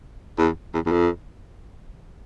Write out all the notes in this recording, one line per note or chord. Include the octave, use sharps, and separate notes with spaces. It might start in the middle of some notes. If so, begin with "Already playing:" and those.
E2
E2
E2
F2